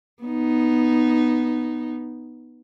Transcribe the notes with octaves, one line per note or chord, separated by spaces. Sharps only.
B3 D#4